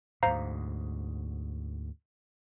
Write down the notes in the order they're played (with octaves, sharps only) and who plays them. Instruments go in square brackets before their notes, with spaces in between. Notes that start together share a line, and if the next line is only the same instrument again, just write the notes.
[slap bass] D2 G#2 [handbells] C5 F5 A#5